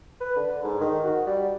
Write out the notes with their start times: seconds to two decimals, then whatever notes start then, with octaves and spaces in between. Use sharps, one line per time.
0.21 B4
0.36 D3
0.64 G#2
0.81 D#3
1.04 F#4
1.27 G3